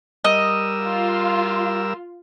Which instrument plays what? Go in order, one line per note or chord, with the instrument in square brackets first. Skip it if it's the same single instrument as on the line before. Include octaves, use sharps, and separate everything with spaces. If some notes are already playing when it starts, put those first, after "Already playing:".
[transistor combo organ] G3 A#4 E6 [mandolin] D#5
[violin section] F4